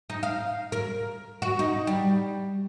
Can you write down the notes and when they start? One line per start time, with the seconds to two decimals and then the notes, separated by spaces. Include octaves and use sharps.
0.10 D#4
0.23 F5
0.72 A#4
1.42 F#4
1.59 D#4
1.87 G3